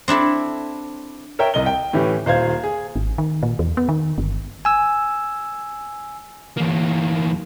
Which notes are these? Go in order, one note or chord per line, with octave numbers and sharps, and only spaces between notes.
C4 D4 E4 A4
A#4 C#5 E5 G5
C2 D#5 G7
G5
A2 E3 C#4 G4
D#1 C5 F5 G#6
G#4
G#1
D#3
A#2
E2
B3
D#3
G1
G#5 E6
E2 A#3